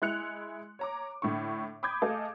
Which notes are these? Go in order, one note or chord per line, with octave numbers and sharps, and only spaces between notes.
G#3 E4 F#6 C#7 F7
C#5 A#5 D6
A2 D3 C#6
B5 D6 D#6 G6 G#6
A3 G#4 A4 D#5 F5